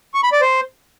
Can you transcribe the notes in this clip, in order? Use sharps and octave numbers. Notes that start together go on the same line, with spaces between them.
C#6
B5
D5
C5